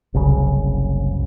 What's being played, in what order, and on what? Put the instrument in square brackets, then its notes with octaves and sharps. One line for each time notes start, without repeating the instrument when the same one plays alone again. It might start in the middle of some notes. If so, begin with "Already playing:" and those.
[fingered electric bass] F#1 C2 C#3